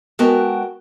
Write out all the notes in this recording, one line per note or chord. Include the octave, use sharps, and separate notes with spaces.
G#3 B3 F#4 A#4 G5 A5